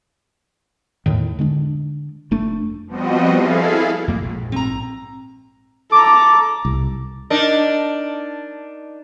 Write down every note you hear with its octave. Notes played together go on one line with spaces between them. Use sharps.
E2 A2 D#3
D3 G#3 C4 D4
F1 A3 D4
F3 G3 B3 C4 F#4 D#5
E4 G#4 A4 F5
F2 A#3
A#1 G#2
C4 A#5
A4 A#5 D6
C2
D4 D#4 A#4